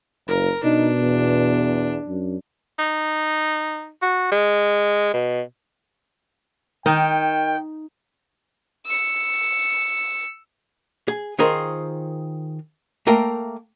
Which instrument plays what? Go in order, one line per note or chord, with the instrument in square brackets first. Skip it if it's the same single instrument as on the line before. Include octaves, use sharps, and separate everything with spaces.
[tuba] F#1 [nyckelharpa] A#4
[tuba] B2 [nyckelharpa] D4 [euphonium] D#4
[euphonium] E2
[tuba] F#2
[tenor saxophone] D#4
F#4
G#3
B2
[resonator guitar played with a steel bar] D#3 [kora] D#4 [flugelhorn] G5
[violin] E6 C#7
[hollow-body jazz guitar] G#4
D#3 F4 G#4 A#4 C5
A3 A#3 A#4 F5 G5